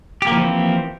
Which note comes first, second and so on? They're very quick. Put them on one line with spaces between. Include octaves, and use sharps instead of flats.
G4 A#3 F3 E3 C4